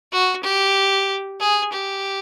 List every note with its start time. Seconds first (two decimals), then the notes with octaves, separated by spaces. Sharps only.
0.12 F#4
0.44 G4
1.40 G#4
1.73 G4